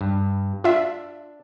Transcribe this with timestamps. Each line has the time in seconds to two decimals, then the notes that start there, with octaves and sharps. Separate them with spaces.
0.01 G2
0.64 D4 F4 E5